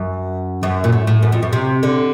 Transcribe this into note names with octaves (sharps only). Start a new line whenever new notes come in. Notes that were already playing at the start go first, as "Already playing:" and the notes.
Already playing: F#2
F#2
A#2
A2
A2
F#2
F2
F#2
C3
D3